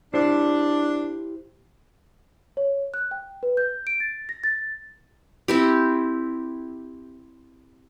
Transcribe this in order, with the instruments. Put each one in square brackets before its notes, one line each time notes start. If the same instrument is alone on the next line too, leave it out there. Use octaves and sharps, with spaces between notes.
[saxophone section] D4 [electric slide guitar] E4 G4 C5
[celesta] C#5
F#6
G5
B4
G6
D7
A6
A#6
A6
[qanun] C4 E4 G4